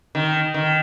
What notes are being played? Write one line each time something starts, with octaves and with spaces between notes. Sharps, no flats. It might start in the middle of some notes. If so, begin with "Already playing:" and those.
D#3
D#3